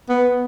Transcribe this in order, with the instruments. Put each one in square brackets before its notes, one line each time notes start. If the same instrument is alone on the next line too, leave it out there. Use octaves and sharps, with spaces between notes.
[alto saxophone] B3